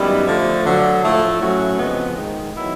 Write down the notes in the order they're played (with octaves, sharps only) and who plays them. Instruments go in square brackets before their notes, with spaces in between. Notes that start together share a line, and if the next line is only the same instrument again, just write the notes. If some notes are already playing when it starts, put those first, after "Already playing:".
Already playing: [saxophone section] F#2 D#3 G3 B3 E4
D3 F3 A3
D2 D3 F#3
A2 F3 A3
A2 F#3 A3 C#4 F#4
F2 C#3 F3 G#3 B3
G#2 D#3 G#3
D#3 F#3 B3 E4